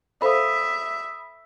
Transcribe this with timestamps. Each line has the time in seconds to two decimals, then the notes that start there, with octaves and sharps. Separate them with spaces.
0.22 A4 C5 E5 F5 B5 D#6